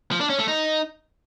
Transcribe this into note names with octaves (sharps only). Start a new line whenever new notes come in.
F3
D4
C#4
A3
D#4